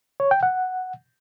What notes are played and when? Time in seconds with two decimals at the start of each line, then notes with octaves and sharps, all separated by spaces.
0.20 C#5
0.31 G5
0.43 F#5